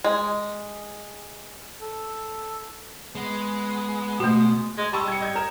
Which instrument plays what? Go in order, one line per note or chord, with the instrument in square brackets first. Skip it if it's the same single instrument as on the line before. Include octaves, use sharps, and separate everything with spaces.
[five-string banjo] G#3
[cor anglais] A4
[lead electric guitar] G#3 [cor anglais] B3
[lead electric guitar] B2 [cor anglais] G#3 [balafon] A3 F#4
[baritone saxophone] G#3
[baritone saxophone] G3 [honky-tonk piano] A5 C#6 E6
[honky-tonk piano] G#6 C#7
D#5 G6 G#6
A#4 E7